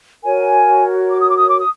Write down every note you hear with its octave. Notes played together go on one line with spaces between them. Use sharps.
F#4 A#4 C#5 G#5
D6
D#6
D6
D#6
D6
D#6